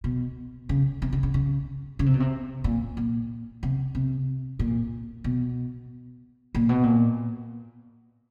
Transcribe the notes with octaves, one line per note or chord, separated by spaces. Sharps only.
B2
C#3
C3
C#3
C#3
C#3
C#3
C3
B2
C3
A#2
A#2
C3
C3
A#2
B2
A#2
B2
A#2